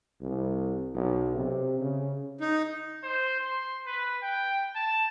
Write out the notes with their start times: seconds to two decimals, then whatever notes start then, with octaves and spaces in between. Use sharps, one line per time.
0.21 C2
0.95 B1
1.36 C3
1.81 C#3
2.41 D#4
3.03 C5
3.40 C6
3.86 B4
4.23 G5
4.75 A5